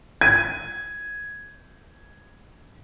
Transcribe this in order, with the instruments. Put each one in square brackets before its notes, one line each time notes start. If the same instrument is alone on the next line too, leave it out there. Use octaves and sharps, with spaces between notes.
[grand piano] G#6 D#7